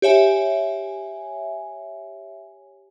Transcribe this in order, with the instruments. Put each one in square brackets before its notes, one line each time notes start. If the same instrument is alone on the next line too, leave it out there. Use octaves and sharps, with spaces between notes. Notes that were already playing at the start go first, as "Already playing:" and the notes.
[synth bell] G4 C#5 E5 G#5